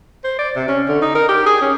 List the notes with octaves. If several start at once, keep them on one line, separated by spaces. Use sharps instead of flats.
C5
D5
C3
C#4
D3
D#4
A#4
G4
G#4
C#4